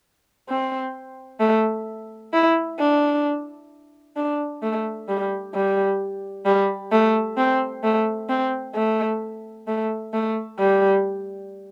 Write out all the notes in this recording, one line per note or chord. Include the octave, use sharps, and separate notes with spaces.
C4
A3
E4
D4
D4
A3
G3
G3
G3
A3
C4
A3
C4
A3
A3
A3
G3